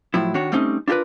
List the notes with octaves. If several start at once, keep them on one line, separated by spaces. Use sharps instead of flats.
A2 F3 F#3 E4
D#3 D4 F#4 C#5
G3 A3 C4 C#4 D#4
D4 F4 G4 A#4 B4